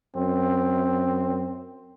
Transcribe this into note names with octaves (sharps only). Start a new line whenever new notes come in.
F#2 C4